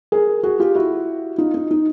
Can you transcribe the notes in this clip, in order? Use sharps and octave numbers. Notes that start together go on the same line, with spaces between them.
G#4 A#4
F#4 G#4
F4 G4
E4 F#4
D#4 F4
D#4
D#4